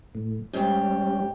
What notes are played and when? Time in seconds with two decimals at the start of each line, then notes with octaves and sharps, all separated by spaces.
0.15 A2
0.53 G#2 G3 C#4 G4